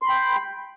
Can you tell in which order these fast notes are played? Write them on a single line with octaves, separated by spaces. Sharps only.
C6 B5 G5